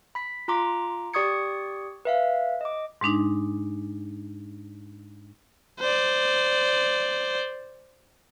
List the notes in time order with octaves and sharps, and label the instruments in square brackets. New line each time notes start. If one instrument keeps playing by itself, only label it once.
[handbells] B5 B6
F4 A#5 C6 D6
G4 D5 C#6 D#6 G#6 C#7
B4 E5 F5
D#5 D6
[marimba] G#2 G#3 D4 D#4
[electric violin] C5 D5